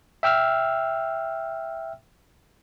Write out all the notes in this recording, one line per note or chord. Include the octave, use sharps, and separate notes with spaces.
E5 G5 E6 F6